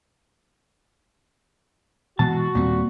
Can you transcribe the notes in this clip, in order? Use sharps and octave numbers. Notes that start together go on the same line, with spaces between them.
B2 E3 G#3 F#4 A5
D#2 A#2 G3 C4